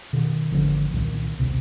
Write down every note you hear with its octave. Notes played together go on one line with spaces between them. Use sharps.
B2 D#3
G#1 D3 F3 D4
C2 A#2 D#3
D#1 B1 C3